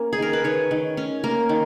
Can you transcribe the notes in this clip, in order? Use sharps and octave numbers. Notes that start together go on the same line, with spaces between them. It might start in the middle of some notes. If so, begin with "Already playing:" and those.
Already playing: A#3 C#4
G#4
D#3 A#4
B4
D#3 C#5
D#3
C#4
A#3 A#4
D#3